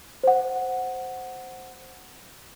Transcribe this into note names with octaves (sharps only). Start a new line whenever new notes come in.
C5 F#5